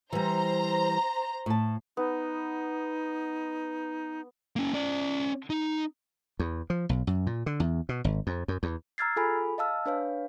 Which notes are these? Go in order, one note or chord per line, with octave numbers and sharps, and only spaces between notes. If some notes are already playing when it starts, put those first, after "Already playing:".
E3 G3 C5 A#5
A2 A5
B3 D#4
A#3 C#4
C#4 D5
D#4
E2
F3
B1
F#2
A#2
D3
E2
B2
G#1
F2
F#2
E2
A#5 E6 F6 G#6 A6 C7
F4 G#4 A4 G#5 B5
D#5 F5 A5 E6 F6
D4 B4 C#5 F5